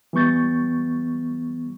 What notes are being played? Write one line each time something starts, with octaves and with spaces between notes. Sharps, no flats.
E3 G3 B3 C#6 G6 A6